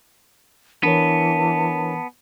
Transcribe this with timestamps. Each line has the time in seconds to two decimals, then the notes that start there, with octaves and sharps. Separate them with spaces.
0.83 E3 B3 D4 A#4 C#5 A5